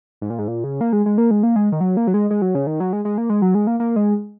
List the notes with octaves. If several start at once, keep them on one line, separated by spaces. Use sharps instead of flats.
G#2
A#2
G#2
A#2
C#3
A#3
G#3
G#3
A#3
G#3
A#3
G#3
D#3
F#3
A#3
F#3
G#3
G#3
F#3
C#3
D#3
F#3
G#3
G#3
A#3
G#3
F#3
G#3
A#3
A#3
G#3